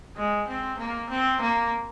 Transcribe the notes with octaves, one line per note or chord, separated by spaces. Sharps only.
G#3
C4
A#3
C4
A#3